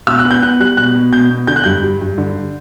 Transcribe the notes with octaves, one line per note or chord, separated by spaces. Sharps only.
B2 E6
F#6
B3
G6
B3 F#6
G3 F#6
B2 F#6
B2
B2 G6
B2
D3 G6
F#6
G2 G6
G3
G2
D3